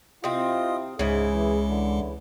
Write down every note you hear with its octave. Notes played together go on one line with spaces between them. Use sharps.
C3 C4 E4 F4 D#5 D#6
C#2 G#2 C#3 G#3 E4 G#4
E3
D3 E3